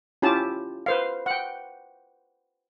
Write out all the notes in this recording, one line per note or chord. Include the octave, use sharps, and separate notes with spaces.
C#4 E4 F4 G4 A5
B4 C5 F5
F#5 G5